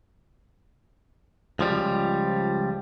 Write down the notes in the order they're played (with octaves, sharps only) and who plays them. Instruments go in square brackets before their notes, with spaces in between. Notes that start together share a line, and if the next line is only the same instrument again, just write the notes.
[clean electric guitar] C#2 F3 G3